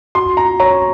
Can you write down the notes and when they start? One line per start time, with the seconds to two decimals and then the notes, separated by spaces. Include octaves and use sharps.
0.15 F#4 C6
0.37 A#5
0.60 C#5 A#5